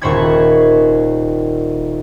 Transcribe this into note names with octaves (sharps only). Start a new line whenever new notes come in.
D#1 D#3 C5 B5 C#6 G#6